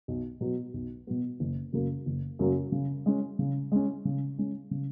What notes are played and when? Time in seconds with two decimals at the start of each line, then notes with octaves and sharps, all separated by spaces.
0.08 B1
0.41 B2 F#3 B3
0.74 B1
1.07 B2 F#3 B3
1.40 F#1
1.73 F#2 C#3 F#3 A#3
2.06 F#1
2.39 F#2 C#3 F#3 A#3
2.72 C#3
3.06 G#3 C#4
3.39 C#3
3.72 G#3 C#4
4.05 C#3
4.38 G#3 C#4
4.71 C#3